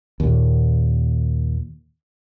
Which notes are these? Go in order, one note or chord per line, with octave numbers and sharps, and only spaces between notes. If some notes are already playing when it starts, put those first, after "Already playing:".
D#2 A#2